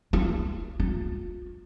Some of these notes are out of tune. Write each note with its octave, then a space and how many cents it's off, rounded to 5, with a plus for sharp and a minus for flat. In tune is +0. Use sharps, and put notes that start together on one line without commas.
F4 -45
F4 +35